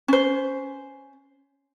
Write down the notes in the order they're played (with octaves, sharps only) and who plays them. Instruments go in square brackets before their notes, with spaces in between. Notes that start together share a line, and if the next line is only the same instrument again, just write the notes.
[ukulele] C#4 C5